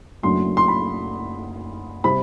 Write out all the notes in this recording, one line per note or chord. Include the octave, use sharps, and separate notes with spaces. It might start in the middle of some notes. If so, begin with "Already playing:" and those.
F#1 F#2 F#3 A3 D4 C6
C6
B5
C3 G3 C4 B5